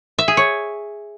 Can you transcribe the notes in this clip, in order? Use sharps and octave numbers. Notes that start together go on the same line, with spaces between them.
E5
G#4
C#5